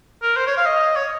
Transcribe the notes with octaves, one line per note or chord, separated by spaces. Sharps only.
A#4
C5
C#5
F5
D#5
C#5